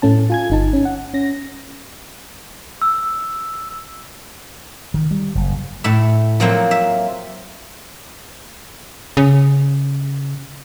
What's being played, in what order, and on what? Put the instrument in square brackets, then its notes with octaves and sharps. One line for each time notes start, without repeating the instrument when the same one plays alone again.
[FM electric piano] A2 A3 C#4 A5
F4 G#5 G#6
G1 D#4 A5
C#4
F#5
C#4 A#6
[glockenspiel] E6
[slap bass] D#3
G3
F#1
[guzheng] A2 E5
F3 F#3 A#3 C4
E5
[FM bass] C#3